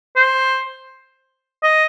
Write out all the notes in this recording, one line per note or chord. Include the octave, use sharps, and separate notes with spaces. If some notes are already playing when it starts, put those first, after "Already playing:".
C5
D#5